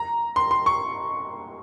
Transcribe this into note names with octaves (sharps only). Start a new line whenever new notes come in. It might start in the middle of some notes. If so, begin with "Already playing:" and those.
Already playing: A#5
C6
C6
C#6